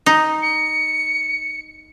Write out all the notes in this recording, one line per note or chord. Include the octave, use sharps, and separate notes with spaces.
D#4
C#7